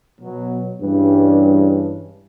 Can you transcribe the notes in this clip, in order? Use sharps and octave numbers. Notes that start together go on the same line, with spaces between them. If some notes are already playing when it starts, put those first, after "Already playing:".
B2 F#3
G2 E3 G3 G#3 C#4 D4